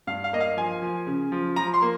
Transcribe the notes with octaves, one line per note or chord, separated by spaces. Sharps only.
G2 F5
F5
A#3 D#5
F5
F3 G#5
F3
C#3
F3
F3 A#5
C6
A#3